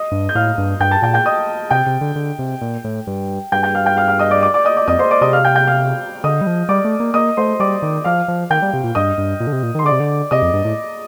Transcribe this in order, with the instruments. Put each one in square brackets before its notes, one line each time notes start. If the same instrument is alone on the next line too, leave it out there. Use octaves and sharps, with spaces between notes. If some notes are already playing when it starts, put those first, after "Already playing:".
Already playing: [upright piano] D#5 D#6
[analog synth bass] G2
[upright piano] G6
[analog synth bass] A2 [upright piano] F5 F6
[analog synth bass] G2
[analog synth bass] G2 [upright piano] G5 G6
[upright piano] A5 A6
[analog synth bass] A#2 [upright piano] G5 G6
[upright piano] G5 G6
D#5 D#6
[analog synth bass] C3 [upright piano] G5 G6
[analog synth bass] C3
D3
D3
C3
A#2
A2
G2
[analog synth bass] G2 [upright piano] G5 G6
[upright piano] G5 G6
F5 F6
G5 G6
F5 F6
F5 F6
D#5 D#6
D5 D6
D5 D6
D5 D6
D#5 D#6
D5 D6
[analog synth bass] F2 [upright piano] D#5 D#6
[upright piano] C5 C6
D5 D6
[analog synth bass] C3 [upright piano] D#5 D#6
[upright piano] F5 F6
G5 G6
G5 G6
F5 F6
[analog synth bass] D3 [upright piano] D#5 D#6
[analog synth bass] G3
F3
[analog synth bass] G3 [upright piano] D5 D6
[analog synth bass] A3
A#3
[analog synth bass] A#3 [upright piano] D#5 D#6
[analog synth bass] A3 [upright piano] C5 C6
[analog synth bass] G3 [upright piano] D5 D6
[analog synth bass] D#3
[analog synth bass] F3 [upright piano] F5 F6
[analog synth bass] F3
[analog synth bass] D#3 [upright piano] G5 G6
[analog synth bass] G3
C3
A#2
[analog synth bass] G2 [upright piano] D#5 D#6
[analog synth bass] G2
A#2
D3
C3
A#2
D#3
[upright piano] C6
[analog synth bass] D3 [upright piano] D5 D6
[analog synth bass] C3
D3
[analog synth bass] C3 [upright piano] D#5 D#6
[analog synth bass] F2
G2
A2